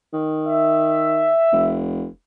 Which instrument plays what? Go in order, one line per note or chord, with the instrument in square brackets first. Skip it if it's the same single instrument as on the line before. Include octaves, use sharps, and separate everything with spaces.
[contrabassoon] D#3
[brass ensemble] E5
[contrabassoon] F1